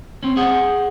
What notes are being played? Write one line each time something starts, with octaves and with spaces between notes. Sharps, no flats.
C4 C#4
G#4 C5 F#5